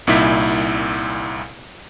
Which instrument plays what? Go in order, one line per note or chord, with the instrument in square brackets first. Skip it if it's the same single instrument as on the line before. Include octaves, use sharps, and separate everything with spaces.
[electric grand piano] C2 A#2 D#4 E4 B6